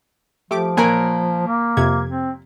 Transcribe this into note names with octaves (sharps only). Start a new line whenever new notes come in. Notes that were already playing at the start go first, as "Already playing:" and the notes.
F3 A3 G4 D6
A#2 A#4 C#5 G#5 F#6
A#3
F2 C3 G#6
C4